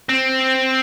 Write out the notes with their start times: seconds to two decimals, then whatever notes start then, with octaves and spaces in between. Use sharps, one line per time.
0.09 C4